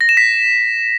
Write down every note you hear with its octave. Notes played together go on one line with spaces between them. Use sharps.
A#6
E7
B6